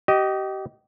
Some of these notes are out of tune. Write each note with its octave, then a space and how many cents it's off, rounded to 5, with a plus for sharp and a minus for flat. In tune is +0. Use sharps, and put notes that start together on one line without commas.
G4 -30 D#5 +0